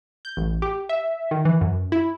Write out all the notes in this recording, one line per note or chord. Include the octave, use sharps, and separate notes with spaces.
G6
A1
G4
E5
D#3
E3
F#2
E4